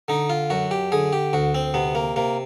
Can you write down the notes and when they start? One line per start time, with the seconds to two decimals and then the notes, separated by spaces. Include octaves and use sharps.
0.08 D3 D#4
0.30 F4
0.50 F#2 F#4
0.71 G4
0.92 D3 G#4
1.13 G4
1.33 D2 F#4
1.55 C4
1.74 C3 B3
1.95 A#3
2.16 C3 A#3